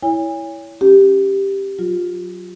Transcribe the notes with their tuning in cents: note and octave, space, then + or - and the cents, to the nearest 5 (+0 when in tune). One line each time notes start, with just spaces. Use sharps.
E4 +0 C#5 +25 G#5 -35
C#4 +0 G4 +0
F#3 +0 F4 +20